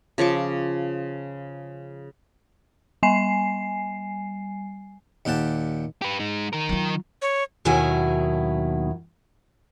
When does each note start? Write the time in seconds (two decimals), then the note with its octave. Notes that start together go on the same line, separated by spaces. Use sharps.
0.18 C#3 F3 C#6 D6
3.03 G3 G#5 C7
5.25 D#2 A#2 G4 F#5 A5
6.02 G4 B4
6.20 G#3 D#4
6.53 D#3 A#4
6.69 F#3 F4
7.22 C#5
7.65 D#2 B2 D#3 F#3 E4 G#5